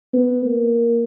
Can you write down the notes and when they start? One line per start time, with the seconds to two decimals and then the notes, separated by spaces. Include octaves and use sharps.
0.13 B3
0.45 A#3